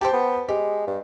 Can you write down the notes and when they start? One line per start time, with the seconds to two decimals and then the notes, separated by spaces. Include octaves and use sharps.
0.01 G4 C5 G5 A5
0.13 B3
0.49 G#3 G4
0.87 G2